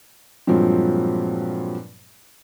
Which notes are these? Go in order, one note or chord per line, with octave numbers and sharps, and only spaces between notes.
G2 A#2 F3 F#3 G#3 C4